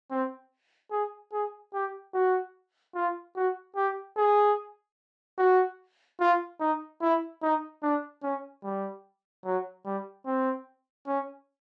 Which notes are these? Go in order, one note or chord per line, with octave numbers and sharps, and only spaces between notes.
C4
G#4
G#4
G4
F#4
F4
F#4
G4
G#4
F#4
F4
D#4
E4
D#4
D4
C#4
G3
F#3
G3
C4
C#4